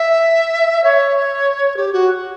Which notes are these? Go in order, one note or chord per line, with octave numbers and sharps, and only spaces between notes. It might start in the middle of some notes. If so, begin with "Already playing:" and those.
Already playing: E5
C#5
G4
F#4